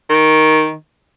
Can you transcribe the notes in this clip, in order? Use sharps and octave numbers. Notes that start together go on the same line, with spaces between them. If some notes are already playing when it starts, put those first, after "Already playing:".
D#3